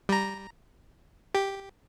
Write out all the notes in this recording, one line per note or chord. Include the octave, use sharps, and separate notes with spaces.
G3 A#5
G4